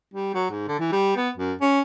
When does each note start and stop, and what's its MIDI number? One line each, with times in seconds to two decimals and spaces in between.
0.14 0.32 55
0.34 0.47 54
0.50 0.64 44
0.68 0.75 50
0.79 0.92 52
0.92 1.16 55
1.16 1.29 59
1.37 1.53 42
1.61 1.81 61